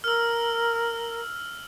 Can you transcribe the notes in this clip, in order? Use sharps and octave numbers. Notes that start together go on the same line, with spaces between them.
A#4 E6 F6